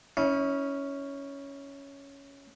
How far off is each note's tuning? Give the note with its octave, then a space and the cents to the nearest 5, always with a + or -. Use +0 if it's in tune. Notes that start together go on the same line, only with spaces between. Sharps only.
C#4 +5 E4 -35